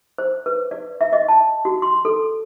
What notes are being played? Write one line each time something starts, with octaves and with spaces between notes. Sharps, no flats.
C5
B4
D5
E5
D#5
A5
F#4
C6
A4